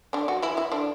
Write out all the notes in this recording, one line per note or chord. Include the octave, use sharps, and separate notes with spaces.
D3 D4
F#3 F#4
E3 E4
E3 E4
D3 D4